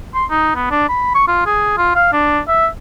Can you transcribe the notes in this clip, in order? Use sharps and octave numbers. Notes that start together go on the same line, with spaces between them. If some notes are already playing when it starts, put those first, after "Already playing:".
C6
D#4
B3
D4
B5
C#6
F4
G#4
F4
F5
D4
E5